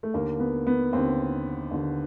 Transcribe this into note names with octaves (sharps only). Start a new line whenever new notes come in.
A3
D#2 D3 A#3
B3
B3
D#2 D3 C4
D#2 D3